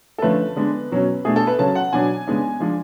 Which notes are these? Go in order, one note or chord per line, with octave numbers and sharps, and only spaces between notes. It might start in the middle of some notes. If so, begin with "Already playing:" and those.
A4
D3 F3 A3 C#4 B4
D3 G#3 B3 D4
B2 F#3 C#4
B2 A3 D4 G#4
A4
B4
C#3 F#3 C#4 A5
F#5
B2 F#3 B3 D4 G#5
C#3 G#3 B3 D4
F3 G#3 D4